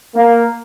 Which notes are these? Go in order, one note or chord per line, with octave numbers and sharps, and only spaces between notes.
A#3